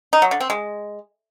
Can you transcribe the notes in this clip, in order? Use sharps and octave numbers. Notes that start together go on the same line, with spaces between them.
D#4
F#3
D3
C4
G#3